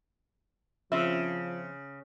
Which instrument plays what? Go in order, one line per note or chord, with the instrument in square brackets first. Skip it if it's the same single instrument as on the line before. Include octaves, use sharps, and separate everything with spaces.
[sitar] C#3 [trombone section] F3 [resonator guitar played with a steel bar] C4 E5